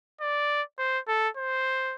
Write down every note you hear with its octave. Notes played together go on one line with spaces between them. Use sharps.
D5
C5
A4
C5